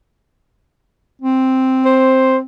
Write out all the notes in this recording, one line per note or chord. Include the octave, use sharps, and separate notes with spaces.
C4
C5